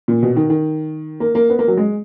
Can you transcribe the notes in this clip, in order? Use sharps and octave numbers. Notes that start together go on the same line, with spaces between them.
A#2
B2
D#3
D#3
A#3
A#3
B3
A#3
F#3
G#3